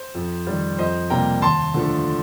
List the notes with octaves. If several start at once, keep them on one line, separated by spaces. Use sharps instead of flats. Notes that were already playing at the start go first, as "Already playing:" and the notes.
Already playing: C5
F2
D#3 G3
F2 C5 D#5
C3 G3 A#3 G5 A#5
D#2 A5 C6
D3 F3 A3